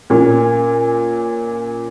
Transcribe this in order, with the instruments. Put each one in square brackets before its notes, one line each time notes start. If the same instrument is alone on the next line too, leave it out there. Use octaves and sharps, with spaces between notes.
[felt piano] A#2 C#4